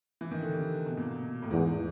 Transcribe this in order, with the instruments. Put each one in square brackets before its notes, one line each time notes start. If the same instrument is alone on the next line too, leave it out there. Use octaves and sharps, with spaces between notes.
[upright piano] E3
D#3
D3
C3
B2
A#2
B2
A2
[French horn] E2 [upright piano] G#2